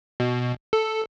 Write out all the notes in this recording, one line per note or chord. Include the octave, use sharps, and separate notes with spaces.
B2
A4